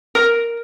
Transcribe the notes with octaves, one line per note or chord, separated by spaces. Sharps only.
A#4